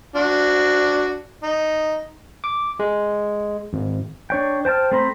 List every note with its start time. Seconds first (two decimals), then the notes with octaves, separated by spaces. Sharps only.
0.16 D4 F#4
1.43 D#4
2.44 D6
2.79 G#3
3.73 G#1
4.30 D4 C#5 G5
4.65 C5 G5 A5 F6
4.91 A3 C4 C5 A#5 B5